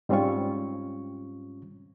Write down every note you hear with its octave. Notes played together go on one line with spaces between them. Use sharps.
G#2 G3 C4 C#4 F4 C#6